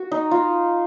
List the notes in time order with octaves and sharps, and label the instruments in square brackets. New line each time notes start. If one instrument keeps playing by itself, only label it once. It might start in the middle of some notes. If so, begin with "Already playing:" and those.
Already playing: [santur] F#4
D#4
F4